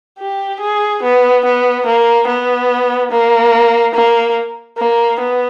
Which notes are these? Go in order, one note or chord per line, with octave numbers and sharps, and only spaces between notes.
G4
G#4
B3
B3
A#3
B3
A#3
A#3
A#3
B3